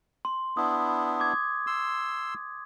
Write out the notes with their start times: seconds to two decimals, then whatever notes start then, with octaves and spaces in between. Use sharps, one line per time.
0.25 C6
0.57 B3 D4 E4 D#6
1.20 D6 D#6 G#6
1.67 C6 E6